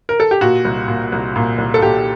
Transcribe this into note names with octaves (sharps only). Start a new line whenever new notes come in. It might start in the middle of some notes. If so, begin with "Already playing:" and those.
A#4
A4
G4
A#2 F#4
C2
A#2
C2
A#2
C2
A4
A#2 G4